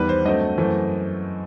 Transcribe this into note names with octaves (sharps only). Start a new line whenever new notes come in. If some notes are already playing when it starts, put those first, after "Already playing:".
Already playing: E2 D#3 G3 B4
C5
G2 F#3 A3 C4 D#5
F#2 E3 A3 C4